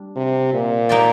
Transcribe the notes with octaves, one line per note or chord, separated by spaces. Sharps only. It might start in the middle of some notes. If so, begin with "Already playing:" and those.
Already playing: G3 D4
C3
A#2
A#3 D#4 G4 D5